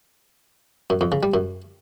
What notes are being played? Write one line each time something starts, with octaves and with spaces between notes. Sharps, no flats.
F#2
F2
C#3
G3
F#2